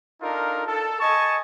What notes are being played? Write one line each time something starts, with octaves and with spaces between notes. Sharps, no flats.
D4 D#4 F4 A4 A#4
A4
D#5 G#5 A5 C#6